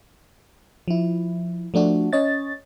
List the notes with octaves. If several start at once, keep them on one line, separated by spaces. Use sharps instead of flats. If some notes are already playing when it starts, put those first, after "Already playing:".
F3 E4
F3 A3 D4 F#4
C#4 C#5 D#5 A6